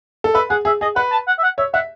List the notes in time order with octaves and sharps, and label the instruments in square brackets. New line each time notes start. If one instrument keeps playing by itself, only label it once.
[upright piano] A4
[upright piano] B4 [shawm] E5
[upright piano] G#4 [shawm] F#5
[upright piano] G#4 [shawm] E5
[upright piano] G#4 [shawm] D#5
[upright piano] B4 [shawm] F#5
[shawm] A5
F#5
E5
F#5
[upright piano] C#5 [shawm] E5
[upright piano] E5 [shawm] F#5